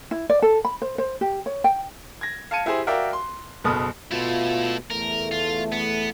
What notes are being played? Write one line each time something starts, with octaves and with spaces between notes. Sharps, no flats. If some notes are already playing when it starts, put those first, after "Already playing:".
E4
D5
A4
B5
C5
C5
G4
C#5
G5
G#6 A#6
F5 A5 G#6 C#7 D#7
E4 G4 G#4 C5
F#4 A#4 D5 E5 F5 G5
C6
F#1 B2 A4 B5 D#6 F6
B2 A3 E4 F4
E2 A3 A#4
F4
B3